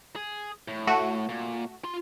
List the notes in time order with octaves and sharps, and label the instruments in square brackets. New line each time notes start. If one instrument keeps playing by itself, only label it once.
[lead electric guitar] G#4
A2
[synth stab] A3 F#4
[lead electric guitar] A#2
F4 C6